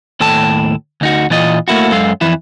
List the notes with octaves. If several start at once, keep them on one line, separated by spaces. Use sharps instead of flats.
D#2 A2 A4 G5 A5
D2 D#4 F#4
A#2 E3 F4 D#5
A3 A#3 E4 F#4
F#2 G#3 A4 F5
F2 E3 E4